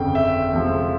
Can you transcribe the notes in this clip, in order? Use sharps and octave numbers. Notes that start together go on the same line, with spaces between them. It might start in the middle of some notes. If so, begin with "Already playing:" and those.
Already playing: G1 F2 C#3 G5
E5
F2 C3 F3 G#3